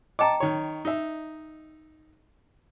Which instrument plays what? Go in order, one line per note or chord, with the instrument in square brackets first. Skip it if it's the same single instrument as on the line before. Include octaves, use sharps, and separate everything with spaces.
[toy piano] D#5 G5 A#5 [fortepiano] A5 D6
[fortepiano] D#3 C#5
D#4 E5